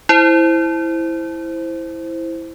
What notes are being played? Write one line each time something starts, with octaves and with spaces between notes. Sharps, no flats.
E4 C5